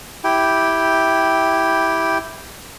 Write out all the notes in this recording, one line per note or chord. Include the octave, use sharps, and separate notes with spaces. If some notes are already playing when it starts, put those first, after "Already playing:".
E4 G4 G5